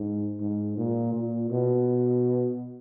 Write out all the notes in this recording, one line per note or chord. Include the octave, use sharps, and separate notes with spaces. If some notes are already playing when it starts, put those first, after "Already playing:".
Already playing: G#2
G#2
A#2
A#2
B2